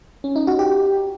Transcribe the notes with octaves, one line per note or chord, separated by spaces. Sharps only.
C#4
D#4
F#4
G4